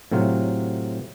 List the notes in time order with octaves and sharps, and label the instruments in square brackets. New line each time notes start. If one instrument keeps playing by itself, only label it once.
[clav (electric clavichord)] A2 C3 F#3 F4